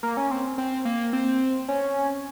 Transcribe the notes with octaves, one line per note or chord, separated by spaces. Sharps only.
A#3
C#4
C4
C4
A#3
C4
C#4